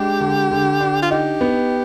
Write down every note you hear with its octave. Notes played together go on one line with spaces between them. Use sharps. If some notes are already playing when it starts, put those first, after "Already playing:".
Already playing: G#3 D4 G4
D3
D3
D4
F4
D#4 G4
B3